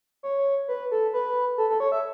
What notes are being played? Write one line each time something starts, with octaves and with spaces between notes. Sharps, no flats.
C#5
B4
A4
B4
A4
A4
C#5
E5